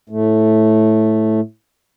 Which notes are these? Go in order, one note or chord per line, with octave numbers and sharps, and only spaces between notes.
A2 A3